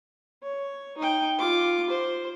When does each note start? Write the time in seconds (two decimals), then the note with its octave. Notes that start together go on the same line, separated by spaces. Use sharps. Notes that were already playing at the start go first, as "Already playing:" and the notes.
0.43 C#5
0.98 D#4 G5
1.38 F4 D6
1.90 C5